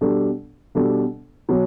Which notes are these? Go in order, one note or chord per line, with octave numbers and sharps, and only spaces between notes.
B2 G3 D4 A4
B2 G3 D4 A4
B2 F#3